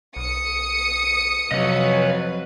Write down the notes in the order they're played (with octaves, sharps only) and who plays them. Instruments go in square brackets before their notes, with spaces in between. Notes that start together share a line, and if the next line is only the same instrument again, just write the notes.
[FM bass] B1 [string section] D#6 C#7
[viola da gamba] F2 F#3 B4 [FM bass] C3 [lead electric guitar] C#5 D#5